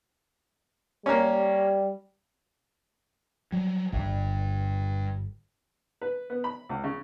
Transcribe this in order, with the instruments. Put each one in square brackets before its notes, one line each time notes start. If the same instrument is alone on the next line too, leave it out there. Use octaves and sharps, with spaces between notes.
[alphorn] G3 [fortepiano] A#3 C#4
[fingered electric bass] F#3 G3
[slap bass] D1 G1 [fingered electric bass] G2
[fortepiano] B4
B3
B5
C#2
C#3